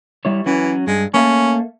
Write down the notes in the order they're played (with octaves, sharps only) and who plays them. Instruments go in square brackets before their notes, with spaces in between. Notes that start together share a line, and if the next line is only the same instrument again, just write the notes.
[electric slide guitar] G3 E4 C#5
[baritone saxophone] E3 [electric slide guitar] F#3 C#4 F#4
[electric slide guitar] G2 [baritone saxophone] G#3
[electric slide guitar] A3 A#3 [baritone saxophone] C#4